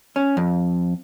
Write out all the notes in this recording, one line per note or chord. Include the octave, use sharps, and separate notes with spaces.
C#4
F2